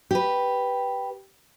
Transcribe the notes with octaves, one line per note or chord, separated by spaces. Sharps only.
G4 B4